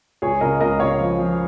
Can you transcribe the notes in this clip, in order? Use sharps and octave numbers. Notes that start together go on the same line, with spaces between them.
C#2 G#4 C#5
C#3 A#4 D#5
C#2 A#4 D#5
C#3 C#5 F5
F3
F3